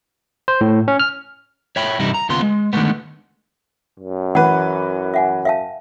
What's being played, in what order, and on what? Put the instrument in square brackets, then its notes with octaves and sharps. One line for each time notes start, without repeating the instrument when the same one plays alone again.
[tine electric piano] C5
A2
C#4
F6
[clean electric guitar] C#5 E5 G5 B5
G2 C3 E3 G3 D#4 E4
A#5
D#2 C#3 B3 F4 C6
G#3
D3 D#3 F#3 G#3 A3 B3
[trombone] F#2
[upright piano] E3 B4 [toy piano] F#5
[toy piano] E5 F#5 G#5
E5 F5 A5